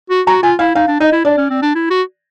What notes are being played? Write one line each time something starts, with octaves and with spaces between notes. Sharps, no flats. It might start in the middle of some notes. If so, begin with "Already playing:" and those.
F#4
F#4 A#5
F4 G#5
E4 F5
D#4 F5
D4
D#4 D#5
E4
D4 D5
C#4
C4
D4
E4
F#4